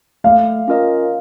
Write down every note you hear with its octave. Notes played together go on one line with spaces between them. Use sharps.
A3 F5
C#4 F4 A#4 D#5